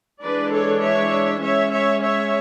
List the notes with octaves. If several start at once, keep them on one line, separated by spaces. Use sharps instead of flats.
E3 G#3 D4 B4 D5
A4 C#5
C#5 E5
G#3 C#4 C#5 E5
C#5 E5
C#5 E5